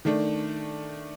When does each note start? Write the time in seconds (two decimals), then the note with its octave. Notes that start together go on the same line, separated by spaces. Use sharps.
0.05 D#3 A3 D4